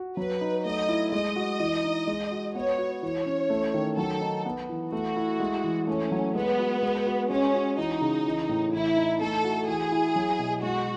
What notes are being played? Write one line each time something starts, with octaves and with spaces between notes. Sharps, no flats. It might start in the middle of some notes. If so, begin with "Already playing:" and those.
Already playing: F#4
F#3 B4
D#4
A3 D#5
E4
G#3 D#5
F#4
E3
D#4
G#3
F#4
B3 C#5
F#4
E3 C#5
C#4
A3
D#3
F#3 A4
D#4
B3
E3
A3 F#4
E4
G#3
E3
A3 C#4
F#3
G#3 B3
F#4
G#3
F#4
G#3 C#4
F#4
E3 D#4
C#3
E3
A2
E3 E4
D#4
A3 A4
F#4
E3 G#4
E4
F#3
B2
G#3 F#4